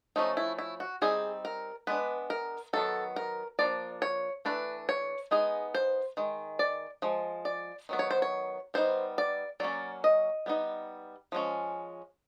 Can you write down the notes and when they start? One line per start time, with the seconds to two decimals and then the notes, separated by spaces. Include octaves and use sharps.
0.16 F3 A3 C#4 D#4
0.37 E4
0.58 E4
0.80 F#4
1.02 G3 C4 D#4 G#4
1.45 A#4
1.87 G#3 B3 D4 B4
2.30 A#4
2.73 D#3 F#3 B3 A4
3.16 A#4
3.59 F3 A#3 D4 D5
4.02 C#5
4.45 E3 A3 D4 B4
4.89 C#5
5.31 G#3 B3 D#4 G#4
5.74 C5
6.17 D#3 G#3
6.59 D5
7.02 F3 G#3
7.45 D5
7.89 D#3 F#3 B3
7.99 C#5
8.11 C5
8.22 C#5
8.74 G3 B3 D#4 C5
9.18 D5
9.60 F#3 A#3 C#4 D5
10.04 D#5
10.46 G3 B3 D#4
11.32 F3 G#3 C#4